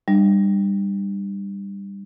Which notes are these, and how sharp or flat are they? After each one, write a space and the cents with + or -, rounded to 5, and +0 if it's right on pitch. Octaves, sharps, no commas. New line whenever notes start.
G3 +15 D4 +40